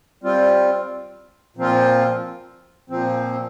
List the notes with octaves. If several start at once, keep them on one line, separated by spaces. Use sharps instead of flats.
G3 C4 F4
A#2 F3 C4 F4
A#2 F3 C4